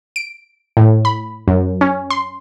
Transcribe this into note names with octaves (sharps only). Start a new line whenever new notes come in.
D7
A2
B5
F#2
C#4
C6